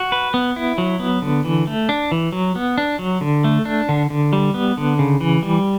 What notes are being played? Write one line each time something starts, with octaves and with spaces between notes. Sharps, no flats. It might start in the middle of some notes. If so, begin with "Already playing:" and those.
Already playing: F#4
B4
B3
E4
F#3
B3
D3
E3
A3
D4
E3
F#3
B3
D4
F#3
D3
A3
D4
D3
D3
G3
B3
D3
C#3
E3
G3